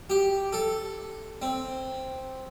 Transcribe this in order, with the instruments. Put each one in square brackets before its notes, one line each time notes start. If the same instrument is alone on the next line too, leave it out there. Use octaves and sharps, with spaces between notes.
[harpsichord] G4
A4
C4